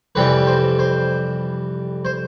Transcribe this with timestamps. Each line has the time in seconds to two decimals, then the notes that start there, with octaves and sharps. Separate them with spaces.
0.15 F2 C3 E3 G3 B4
0.47 C5
0.79 C5
2.05 C5